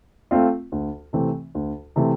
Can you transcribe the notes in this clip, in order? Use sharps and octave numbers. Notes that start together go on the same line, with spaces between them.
A3 C4 F4
D2
C3 E3 A3 C4
D2
C3 E3 A3 C4